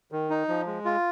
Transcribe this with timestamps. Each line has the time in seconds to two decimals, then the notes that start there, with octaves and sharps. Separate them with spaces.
0.12 D#3
0.30 D#4
0.48 F3
0.66 G#3
0.85 F4